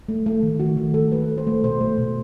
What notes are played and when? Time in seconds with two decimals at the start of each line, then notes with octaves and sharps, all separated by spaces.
0.09 A3
0.26 A3
0.43 D#3
0.60 D#3 F#4
0.77 D#3
0.94 A3 A4
1.12 A3 B4
1.29 A3
1.38 C5
1.47 A3
1.63 B2 C5
1.81 A3
1.98 B2